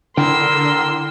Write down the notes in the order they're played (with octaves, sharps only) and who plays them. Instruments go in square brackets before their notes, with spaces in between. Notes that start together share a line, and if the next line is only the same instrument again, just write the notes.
[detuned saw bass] D3 [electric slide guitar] E4 G5 [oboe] A#4 [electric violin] C6 E6